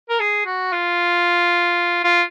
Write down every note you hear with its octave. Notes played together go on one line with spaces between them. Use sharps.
A#4
G#4
F#4
F4
F4